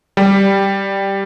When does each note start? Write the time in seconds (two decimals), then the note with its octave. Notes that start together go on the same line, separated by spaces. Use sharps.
0.17 G3